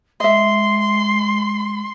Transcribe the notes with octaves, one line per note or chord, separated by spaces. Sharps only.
G#3 D#5 E5 C6